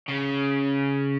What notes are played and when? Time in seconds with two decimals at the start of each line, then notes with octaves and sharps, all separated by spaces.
0.09 C#3